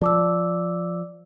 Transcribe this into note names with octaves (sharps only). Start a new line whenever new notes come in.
F3 D5 D6 E6